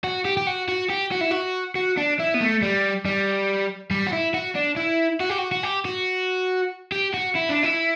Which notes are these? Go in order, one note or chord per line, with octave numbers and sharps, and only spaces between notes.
F#4
G4
G4
F#4
F#4
G4
F#4
E4
F#4
F#4
D4
E4
B3
A3
G3
G3
G3
F#4
E4
F#4
D4
E4
F#4
G4
F#4
F#4
G4
F#4
G4
F#4
E4
D4
E4